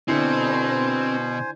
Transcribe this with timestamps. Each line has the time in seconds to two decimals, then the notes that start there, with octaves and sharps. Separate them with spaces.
0.08 B2 D3 C4 D4 E4 C5 G#5